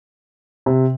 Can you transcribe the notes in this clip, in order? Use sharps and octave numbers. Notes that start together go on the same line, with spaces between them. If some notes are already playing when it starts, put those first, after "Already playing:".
C3